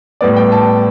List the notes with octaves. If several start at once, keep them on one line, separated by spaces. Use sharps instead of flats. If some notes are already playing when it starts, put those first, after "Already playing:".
A2 G3 B3 D5
G5
A5